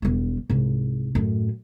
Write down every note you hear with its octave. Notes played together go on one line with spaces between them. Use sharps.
E1 G3
C2 G#2
F#2 A2